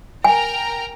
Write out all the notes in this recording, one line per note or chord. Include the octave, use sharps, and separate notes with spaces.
A#4 G5 G#5 A#5